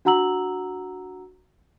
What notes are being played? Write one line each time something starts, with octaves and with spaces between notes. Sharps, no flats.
D4 F#4 F#5 A#5 E6 F#7